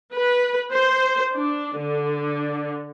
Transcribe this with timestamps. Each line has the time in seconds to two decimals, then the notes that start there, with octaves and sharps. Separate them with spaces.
0.14 B4
0.73 C5
1.36 D4
1.81 D3